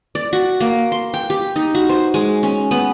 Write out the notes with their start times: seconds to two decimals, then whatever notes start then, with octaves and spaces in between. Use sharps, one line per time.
0.15 D5
0.33 F#4
0.60 A#3
0.92 C6
1.14 G5
1.30 G4
1.56 D#4
1.75 F#4
1.89 C5
2.14 G#3
2.43 C#4
2.71 B3